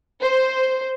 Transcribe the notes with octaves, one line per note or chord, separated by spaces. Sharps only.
C5